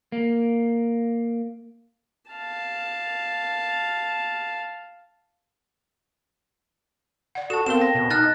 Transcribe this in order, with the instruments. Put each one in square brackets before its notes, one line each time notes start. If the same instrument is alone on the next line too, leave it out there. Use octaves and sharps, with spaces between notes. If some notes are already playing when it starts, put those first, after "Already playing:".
[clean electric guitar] A#3
[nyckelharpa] F5 A5
[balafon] D5 F#5
[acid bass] F#4 [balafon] A4 [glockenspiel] A5 E7
[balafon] B3 A#4 F5 [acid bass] C4 [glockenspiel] E7 G7
[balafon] G5 [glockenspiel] A#6
[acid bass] B2
[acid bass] D#4 [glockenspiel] F6 F#6 A6